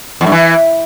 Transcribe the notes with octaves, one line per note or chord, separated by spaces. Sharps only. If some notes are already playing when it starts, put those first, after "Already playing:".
E2
G2
E3